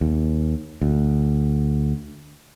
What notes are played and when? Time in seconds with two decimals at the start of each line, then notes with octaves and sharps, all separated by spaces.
0.01 D#2
0.81 D2